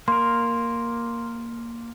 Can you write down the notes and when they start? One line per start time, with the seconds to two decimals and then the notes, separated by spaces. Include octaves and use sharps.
0.08 A#3 A#4 C6